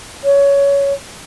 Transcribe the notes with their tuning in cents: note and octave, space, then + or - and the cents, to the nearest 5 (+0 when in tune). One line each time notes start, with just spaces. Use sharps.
C#5 +15